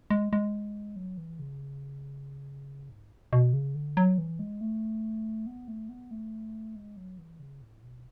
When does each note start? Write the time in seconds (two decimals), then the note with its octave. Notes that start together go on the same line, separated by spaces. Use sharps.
0.10 G#3
0.33 G#3
0.96 F#3
1.18 E3
1.39 C#3
2.89 G#2
3.33 B2
3.53 C#3
3.75 D3
3.97 F#3
4.18 E3
4.39 G#3
4.61 A3
5.47 B3
5.68 A3
5.89 B3
6.11 A3
6.76 G#3
6.97 F#3
7.18 E3
7.39 C#3
7.62 A2
7.83 B2